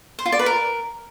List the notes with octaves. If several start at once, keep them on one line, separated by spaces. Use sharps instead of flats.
C5
F4
D5
B4
A#4